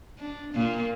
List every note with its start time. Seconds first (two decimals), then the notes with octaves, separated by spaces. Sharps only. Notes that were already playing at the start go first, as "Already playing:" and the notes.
0.19 D4
0.54 A#2 A#3